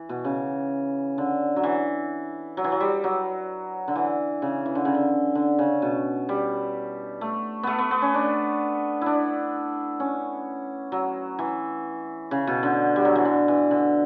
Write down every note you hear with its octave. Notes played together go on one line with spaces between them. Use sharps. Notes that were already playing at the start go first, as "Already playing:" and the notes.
Already playing: E3
B2
C#3
D3
F#3
E3
F#3
E3
F#3
G3
F#3
D3
E3
C#3
E3
D3
C#3
D3
D3
C#3
B2
G3
A3
A3 B3
B3
B3
C#4
D4
D4 E4
C#4
F#3
E3
C#3
B2
D3
G3
F#3
E3
D3
E3
D3